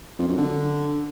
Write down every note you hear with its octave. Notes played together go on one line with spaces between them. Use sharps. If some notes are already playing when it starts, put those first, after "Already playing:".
F2
F#2
D3